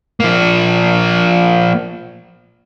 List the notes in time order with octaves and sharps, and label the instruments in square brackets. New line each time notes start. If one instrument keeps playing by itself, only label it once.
[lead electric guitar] F3 A#3